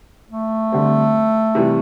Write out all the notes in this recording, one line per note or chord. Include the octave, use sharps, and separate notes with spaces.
A3
D3 G3 C4
C3 E3 G3